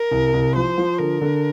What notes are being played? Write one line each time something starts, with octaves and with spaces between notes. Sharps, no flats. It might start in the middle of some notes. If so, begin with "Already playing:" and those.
Already playing: A#4
C2
C2
F3 C5
F3
D3 A#4
D3